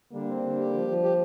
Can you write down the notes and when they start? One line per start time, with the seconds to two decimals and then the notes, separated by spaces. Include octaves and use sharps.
0.13 D3 G3 A#3
0.28 C4
0.43 D3
0.58 G4
0.73 F3
0.88 F3
1.03 G4